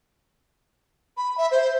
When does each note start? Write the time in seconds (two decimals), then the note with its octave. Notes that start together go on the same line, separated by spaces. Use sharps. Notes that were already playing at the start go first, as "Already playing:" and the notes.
1.17 B5
1.38 E5
1.51 C5